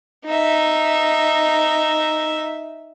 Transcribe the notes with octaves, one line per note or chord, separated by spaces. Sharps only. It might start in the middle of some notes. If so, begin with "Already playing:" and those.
D#4 E5